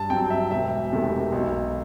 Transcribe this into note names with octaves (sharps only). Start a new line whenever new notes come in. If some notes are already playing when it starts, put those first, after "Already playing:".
Already playing: G2 A5
F#3 C4 G5
E5
E1 E5
E2 C3 D#3 A3
B1